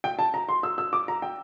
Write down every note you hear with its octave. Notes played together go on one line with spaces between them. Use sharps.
G5
A5
A#5
C6
E6
E6
D6
A#5
G5